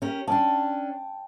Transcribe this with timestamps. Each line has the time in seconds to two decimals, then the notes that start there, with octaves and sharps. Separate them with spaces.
0.02 C#4 G4 A#4
0.28 C#4 D4 G5 A5